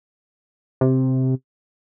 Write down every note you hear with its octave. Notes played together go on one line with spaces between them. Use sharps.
C3